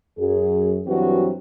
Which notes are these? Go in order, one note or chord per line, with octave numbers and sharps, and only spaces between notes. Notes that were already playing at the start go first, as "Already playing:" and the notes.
F#2 G#4
G2 E3 F#3 C4 F#4